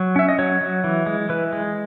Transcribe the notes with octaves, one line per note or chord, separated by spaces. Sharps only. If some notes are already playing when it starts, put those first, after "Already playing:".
Already playing: F#3
C#4 E5
D#5
F#3 C#5
F#3
E3
G#3
E3 B4
G#3